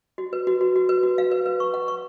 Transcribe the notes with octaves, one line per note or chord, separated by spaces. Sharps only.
F#4
B4
F#4
F#4
F#4
B4
F#4
F5
B4
B4
C#6
F#5
C#6